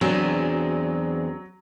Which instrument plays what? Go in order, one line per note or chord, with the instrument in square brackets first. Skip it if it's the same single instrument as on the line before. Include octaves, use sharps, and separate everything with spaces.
[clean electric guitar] E2 D4 [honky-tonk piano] F#3 [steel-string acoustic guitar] C4 G#4